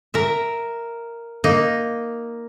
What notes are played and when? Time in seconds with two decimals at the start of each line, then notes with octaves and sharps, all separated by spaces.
0.14 A#4 E5
1.44 A#3 D#4